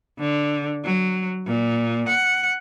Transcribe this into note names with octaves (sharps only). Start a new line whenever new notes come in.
D3
F#3
A#2
F#5